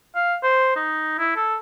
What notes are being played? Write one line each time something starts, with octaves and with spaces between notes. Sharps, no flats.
F5
C5
D#4
E4
A4